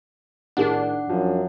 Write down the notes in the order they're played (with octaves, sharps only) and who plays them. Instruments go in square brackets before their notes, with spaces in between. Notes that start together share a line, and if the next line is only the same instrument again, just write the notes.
[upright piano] A2 D#3 G#4 [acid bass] D4 [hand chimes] F#5
[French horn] F#2 [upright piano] F3